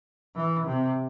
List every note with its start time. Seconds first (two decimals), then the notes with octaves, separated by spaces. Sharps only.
0.36 E3
0.66 C3